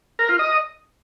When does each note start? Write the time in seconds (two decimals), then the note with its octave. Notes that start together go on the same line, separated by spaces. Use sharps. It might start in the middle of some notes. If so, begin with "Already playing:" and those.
0.19 A#4
0.29 F4
0.39 D#5